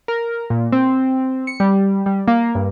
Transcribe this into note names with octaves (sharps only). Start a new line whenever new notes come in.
A#4
A#2
C4
C#7
G3
G3
A#3
G2